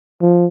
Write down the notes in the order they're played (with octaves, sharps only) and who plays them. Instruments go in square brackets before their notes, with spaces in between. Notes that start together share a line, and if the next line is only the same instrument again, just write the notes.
[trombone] F3